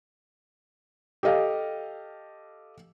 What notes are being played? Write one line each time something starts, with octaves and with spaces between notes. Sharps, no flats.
G4 A4 D#5 F5